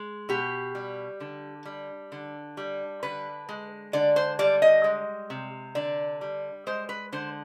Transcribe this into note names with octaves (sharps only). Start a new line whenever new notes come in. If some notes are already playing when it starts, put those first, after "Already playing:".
Already playing: G#3
B2 G4
G3
D3
G3
D3
G3
D3 B4
G#3
D3 D5
C5
G3 D5
D#5
G#3
C3
D3 D5
G3
G#3 C5
B4
D3 C5